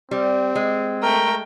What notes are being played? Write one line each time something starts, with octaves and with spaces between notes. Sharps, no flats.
G3 C4
G#3
A3 A#4 G5 A#5